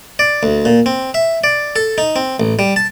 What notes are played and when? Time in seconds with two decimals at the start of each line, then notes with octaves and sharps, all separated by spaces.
0.19 D5
0.43 D2
0.65 A#2
0.86 C4
1.14 E5
1.44 D5
1.76 A4
1.98 D#4
2.16 C4
2.40 A1
2.59 G3
2.76 A5